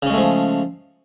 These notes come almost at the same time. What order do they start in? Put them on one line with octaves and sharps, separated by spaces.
C#3 C#4 G#3 A3 F3